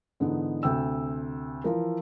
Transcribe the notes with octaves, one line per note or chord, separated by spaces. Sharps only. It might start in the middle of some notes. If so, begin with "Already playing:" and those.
G#2 D3 E3 B3 D#4
D2 C3 G5 E6
E3 F3 A#4